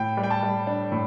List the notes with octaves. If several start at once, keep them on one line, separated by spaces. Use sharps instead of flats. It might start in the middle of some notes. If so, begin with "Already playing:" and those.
Already playing: A2 G5
G3
G5
A5
G3
D4
A2